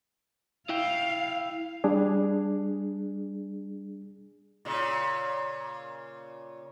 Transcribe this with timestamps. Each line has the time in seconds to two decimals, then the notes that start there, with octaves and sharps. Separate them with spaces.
0.69 E4 F5 G5
1.84 G3 D4 G#4
4.65 A#2 C#3